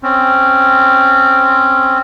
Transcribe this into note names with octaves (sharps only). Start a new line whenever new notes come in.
C4 C#4